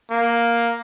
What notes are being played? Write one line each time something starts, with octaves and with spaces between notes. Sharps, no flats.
A#3